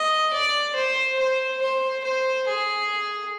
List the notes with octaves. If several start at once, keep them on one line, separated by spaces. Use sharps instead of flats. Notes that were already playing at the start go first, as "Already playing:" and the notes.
Already playing: D#5
D5
C5
C5
C5
C5
G#4